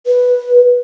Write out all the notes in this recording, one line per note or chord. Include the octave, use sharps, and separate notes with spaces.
B4